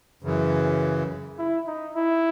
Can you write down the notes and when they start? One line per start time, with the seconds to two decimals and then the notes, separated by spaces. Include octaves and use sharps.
0.23 F#2 C#3 E3
1.38 E4
1.67 D#4
1.96 E4